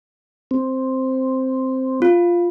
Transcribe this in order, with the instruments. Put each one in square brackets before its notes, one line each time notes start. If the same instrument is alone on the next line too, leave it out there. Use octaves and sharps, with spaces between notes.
[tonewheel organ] C4
[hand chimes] F4